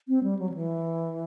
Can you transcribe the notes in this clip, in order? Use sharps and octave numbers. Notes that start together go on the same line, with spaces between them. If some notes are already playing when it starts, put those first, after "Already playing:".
C4
G3
F#3
F3
E3